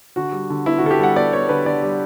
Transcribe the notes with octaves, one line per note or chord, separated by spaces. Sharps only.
D3 F#4
G3
D3
B3 E4
F#4
D3 A4
G4
G3 F#5
B3 D5
B3 C#5
D3 B4
D3 D5
G3